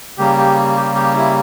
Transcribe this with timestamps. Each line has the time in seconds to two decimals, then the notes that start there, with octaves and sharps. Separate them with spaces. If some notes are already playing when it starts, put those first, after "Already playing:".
0.18 C#3 G3 A#3 G4
0.38 G4
0.76 G4
0.95 G4
1.14 E4